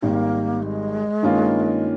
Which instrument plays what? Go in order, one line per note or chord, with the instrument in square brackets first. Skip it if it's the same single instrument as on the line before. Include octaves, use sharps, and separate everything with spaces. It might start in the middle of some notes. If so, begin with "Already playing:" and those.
[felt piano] G#1 G#2 G3 [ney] A#3
[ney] G#3
[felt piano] G2 D#3 A#3 C#4 F4